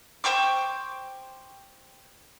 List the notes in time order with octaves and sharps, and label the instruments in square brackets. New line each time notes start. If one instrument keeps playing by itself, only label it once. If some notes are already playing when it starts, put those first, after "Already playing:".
[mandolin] C5 G5 C#6 D6